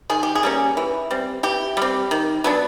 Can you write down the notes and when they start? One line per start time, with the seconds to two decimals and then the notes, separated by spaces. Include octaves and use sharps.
0.10 D#3 G#4
0.23 G4
0.35 G#4
0.43 G3 A#3 C#4
0.77 E3
1.11 G3 C4
1.43 E3 G4
1.77 G3 C4
2.11 D#3
2.44 F#3 B3 D4